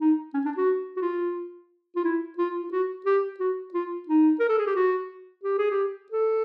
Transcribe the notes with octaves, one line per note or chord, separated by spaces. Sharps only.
D#4
C#4
D4
F#4
F#4
F4
F4
E4
F4
F4
F#4
G4
F#4
F4
D#4
A#4
A4
G#4
G4
F#4
G4
G#4
G4
A4